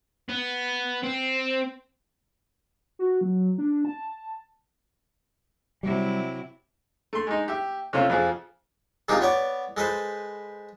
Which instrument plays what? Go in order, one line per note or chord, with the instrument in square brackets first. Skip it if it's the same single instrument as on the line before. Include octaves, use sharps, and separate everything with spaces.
[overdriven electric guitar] B3
C4
[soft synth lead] F#4
F#3
D4
A5
[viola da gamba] C3 F#3 E4 [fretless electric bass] G3
[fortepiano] A3 C6
G#3 D#4
G4 E5
C3 A3 C#4 F4 C5
F2 F3 G#4
[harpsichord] C3 D#3 G#3 D4 D#4 F4
B3 C#5 D5
G#3 A4 B4 C5